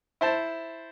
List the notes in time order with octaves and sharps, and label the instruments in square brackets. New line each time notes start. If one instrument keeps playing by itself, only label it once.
[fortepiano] E4 C5 A5